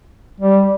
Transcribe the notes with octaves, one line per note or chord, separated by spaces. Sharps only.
G3